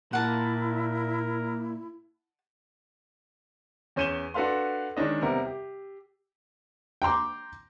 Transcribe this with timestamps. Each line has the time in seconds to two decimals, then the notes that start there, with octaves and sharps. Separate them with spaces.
0.13 A#2 E4 A#4 F#5 A5
3.96 E2 C#4 G6 D#7 E7 G7
4.34 D4 F#4 A4 B4 F5 C6
4.97 D#3 G#3 C#4 D4 D#5
5.22 C3 G3 B3 A#4
5.45 G4
7.02 G5 A#5 C6 D6